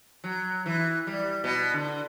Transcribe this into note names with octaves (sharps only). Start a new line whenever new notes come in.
F#3
E3
G3
B2
D3